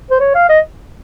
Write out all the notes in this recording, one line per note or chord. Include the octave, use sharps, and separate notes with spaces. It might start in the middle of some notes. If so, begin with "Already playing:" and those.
C5
C#5
F5
D#5